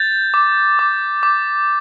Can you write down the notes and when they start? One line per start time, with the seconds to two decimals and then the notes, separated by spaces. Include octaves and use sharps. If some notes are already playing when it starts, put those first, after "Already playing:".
Already playing: G6 A6
0.34 D6
0.79 D6
1.23 D6